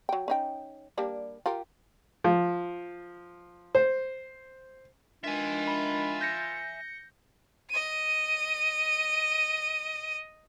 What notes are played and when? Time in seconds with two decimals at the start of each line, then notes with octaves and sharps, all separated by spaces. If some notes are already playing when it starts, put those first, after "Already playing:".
0.09 F#3 G5
0.28 C#4 D#4 G5
0.97 G3 A#3 D4
1.46 F4 G4 A#4
2.24 F3
3.75 C5
5.24 D#3 G#3 D4 F4 E5 G#5
5.67 B5
6.21 G6 A#6 C#7
7.70 D#5 D#7